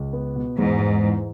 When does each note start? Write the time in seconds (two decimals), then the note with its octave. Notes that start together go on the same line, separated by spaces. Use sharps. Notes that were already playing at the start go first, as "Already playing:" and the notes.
Already playing: C#2
0.13 B3
0.36 B2
0.57 E2 G#2
0.80 E2
1.03 E3